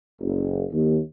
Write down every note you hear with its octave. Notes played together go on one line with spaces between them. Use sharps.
F#1
D#2